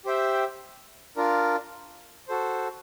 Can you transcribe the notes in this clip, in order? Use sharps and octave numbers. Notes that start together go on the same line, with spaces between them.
G4 C5 E5 G5
D4 F4 A#4
F#4 A4 C5